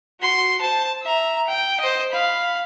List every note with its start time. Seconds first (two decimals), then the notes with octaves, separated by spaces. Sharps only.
0.21 F#4 C6
0.61 C5 A5
1.02 E5 A#5
1.47 G5
1.80 C5 D#5
2.12 F5 B5